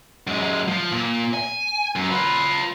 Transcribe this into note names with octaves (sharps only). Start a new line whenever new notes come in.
F#2 G#3
F3
A#2
G#5
F#2
F4 B4